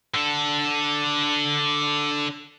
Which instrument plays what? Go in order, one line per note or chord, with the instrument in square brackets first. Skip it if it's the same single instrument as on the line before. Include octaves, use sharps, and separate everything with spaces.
[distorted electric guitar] D3 A4